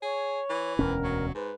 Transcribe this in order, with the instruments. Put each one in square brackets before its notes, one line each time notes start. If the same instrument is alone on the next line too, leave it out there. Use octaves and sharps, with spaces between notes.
[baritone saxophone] G#4 [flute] C#5
[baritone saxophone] E3
[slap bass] E1 D2 C#4 [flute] A#4
[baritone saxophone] F#3
[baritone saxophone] G#2 [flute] B4